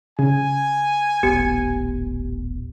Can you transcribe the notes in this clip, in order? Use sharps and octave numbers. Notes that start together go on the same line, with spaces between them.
C#3 G#5
D#1 A1 B3 G4